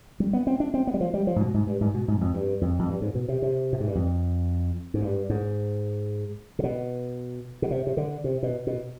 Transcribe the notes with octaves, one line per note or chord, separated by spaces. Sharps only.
G3
B3
C4
D4
C4
B3
G3
F3
G3
F3
G#2
B2
G#2
G2
G#2
B2
G#2
F2
G2
F2
F2
G2
G#2
B2
C3
C3
B2
G#2
G2
F2
G#2
G2
G#2
C3
B2
B2
C3
C3
D3
C3
B2
B2